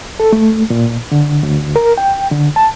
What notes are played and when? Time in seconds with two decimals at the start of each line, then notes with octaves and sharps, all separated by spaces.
0.20 A4
0.33 A3
0.70 A#2
1.12 D3
1.43 D2
1.76 A#4
1.98 G5
2.31 D3
2.56 A5